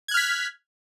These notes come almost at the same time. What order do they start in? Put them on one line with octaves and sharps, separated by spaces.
G#6 F#6 F6 B6